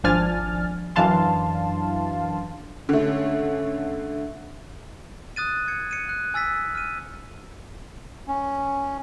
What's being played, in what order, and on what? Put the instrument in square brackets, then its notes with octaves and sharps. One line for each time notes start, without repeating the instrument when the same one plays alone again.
[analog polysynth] G#1 F3 D4 G#5 F6 A6
F#2 E3 D4 F5 A5 C6
[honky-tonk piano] D3 A3 [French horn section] C#4
[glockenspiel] D#6 F#6 A6 D#7
G#6 C#7
C#7 D#7
F#6
G#5 E6 A6 B6
F6 D#7
[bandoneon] C#4